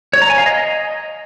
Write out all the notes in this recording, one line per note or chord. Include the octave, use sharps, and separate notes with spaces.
C#5
A#5
G#5
F5
D#5